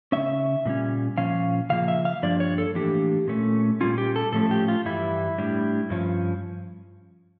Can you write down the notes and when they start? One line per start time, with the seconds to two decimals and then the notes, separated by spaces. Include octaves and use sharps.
0.12 C#3 G3 C#4 E5
0.65 A#2 G3 C#4
1.17 A#2 F3 C#4 F5
1.70 C#3 F3 A#3 F5
1.88 E5
2.05 F5
2.22 G2 F3 A#3 D4 D5
2.40 C#5
2.58 A4
2.75 A2 E3 A#3 D4 G4
3.28 A#2 A3 C#4
3.81 A#2 G3 C#4 F4
3.98 G4
4.16 A4
4.32 A2 F3 A3 C#4 A4
4.51 G4
4.68 F4
4.85 G2 E3 G3 E4
5.38 A2 G3 D4
5.90 G2 F3 C#4